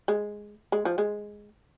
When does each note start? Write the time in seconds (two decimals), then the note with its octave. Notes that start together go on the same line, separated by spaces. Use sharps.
0.08 G#3
0.72 G#3
0.85 F3
0.98 G#3